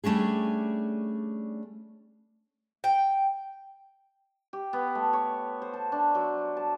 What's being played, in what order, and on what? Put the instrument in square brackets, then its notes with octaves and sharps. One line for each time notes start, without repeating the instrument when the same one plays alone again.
[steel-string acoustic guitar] G3 A3 C#4 D4 G#4
[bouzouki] G5
[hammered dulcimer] G4
B3
A3
C#5
C5
A5
D4
F#3
A5